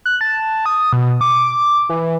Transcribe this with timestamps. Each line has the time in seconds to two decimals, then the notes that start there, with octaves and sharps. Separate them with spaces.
0.06 F#6
0.21 A5
0.66 D#6
0.93 B2
1.21 D6
1.89 E3